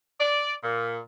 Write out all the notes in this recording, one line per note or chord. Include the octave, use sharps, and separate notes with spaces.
D5
A#2